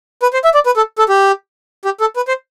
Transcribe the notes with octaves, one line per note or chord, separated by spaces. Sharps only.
B4
C5
E5
D5
B4
A4
A4
G4
G4
A4
B4
C5